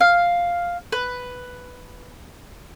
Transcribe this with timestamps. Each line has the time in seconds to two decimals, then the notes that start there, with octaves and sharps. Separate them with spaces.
0.01 F5
0.92 B4